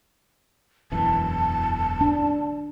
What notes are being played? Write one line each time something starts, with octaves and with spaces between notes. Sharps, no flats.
E1 F#2 E3 A5
D4